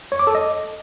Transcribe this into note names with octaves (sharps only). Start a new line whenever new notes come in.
C#5
D6
A4
D#5